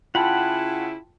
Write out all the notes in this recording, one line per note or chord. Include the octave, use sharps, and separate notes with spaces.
C#3 E4 F4 F#5 G5 A5 B5